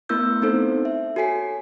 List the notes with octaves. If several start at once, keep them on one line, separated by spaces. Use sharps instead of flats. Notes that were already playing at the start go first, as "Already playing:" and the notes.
A3 B3 E4 A#4 E6 G6
B3 C4 D#4 A4 C5
E5
F#4 A4 C#5 G#5 B6 C7